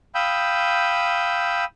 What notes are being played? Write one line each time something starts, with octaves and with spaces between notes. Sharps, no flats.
F5 G5 B5 D#6 E6 G6